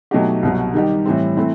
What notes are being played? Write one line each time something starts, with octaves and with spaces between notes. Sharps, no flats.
B2 F#3 A3 D#4 G4
C2 B2 F#3
D#3 G3 D#4 G4
A2 E3 G3 C4
E3 A3 C4 E4